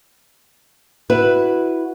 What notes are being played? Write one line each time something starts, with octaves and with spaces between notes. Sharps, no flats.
E4 F#4 B4